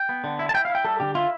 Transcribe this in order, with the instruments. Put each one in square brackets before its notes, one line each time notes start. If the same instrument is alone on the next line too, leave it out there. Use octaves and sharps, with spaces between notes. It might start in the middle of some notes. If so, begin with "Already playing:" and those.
Already playing: [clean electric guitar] G5
B3
D3
E4
A5
E4 G5
F5
E4
G5
G3 A4
D3 G4
E4 F4